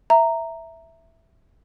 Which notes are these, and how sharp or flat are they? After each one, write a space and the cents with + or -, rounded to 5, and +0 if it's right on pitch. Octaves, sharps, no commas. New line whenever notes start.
E5 +0 A#5 -10